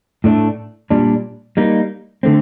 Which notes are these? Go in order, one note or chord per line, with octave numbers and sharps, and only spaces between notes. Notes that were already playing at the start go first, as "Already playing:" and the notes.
A2 A3 D4
A#2 G3 D4
G3 A#3 D#4
D3 A3 C4